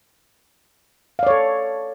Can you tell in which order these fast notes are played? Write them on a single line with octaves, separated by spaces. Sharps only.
F5 D5 C#5 A4